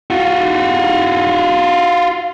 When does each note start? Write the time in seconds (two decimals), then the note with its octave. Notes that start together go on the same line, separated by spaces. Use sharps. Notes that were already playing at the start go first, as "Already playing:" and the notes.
0.10 F4 F#4